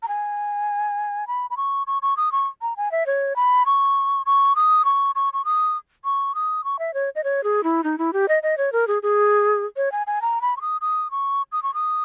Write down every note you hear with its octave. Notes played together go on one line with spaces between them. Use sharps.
A#5
G#5
B5
B5
C#6
C#6
C#6
D#6
C#6
A#5
G#5
E5
C#5
B5
C#6
C#6
D#6
C#6
C#6
C#6
D#6
C#6
D#6
C#6
E5
C#5
D#5
C#5
G#4
E4
D#4
E4
G4
D#5
D#5
C#5
A#4
G#4
G#4
C#5
G#5
G#5
A#5
B5
C#6
D#6
D#6
C#6
D#6
C#6
D#6